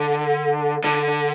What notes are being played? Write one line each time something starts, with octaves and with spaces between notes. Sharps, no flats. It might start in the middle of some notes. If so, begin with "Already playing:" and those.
Already playing: D3
D3